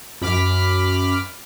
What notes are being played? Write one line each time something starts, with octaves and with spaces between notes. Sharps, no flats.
F#2 B5 D6 F6 B6